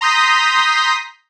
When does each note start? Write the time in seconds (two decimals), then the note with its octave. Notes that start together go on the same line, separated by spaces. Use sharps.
0.01 A#5 C6 D#6 G6 A#6 B6